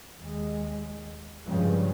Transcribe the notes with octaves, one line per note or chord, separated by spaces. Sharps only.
D#2 G#3
G2 C#3 F3 G3 G#3